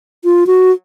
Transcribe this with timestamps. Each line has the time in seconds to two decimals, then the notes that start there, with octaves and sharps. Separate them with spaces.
0.25 F4
0.47 F#4